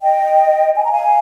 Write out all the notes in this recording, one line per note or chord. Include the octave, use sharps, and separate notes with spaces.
D#5 G5
G#5
A#5
F5 G#5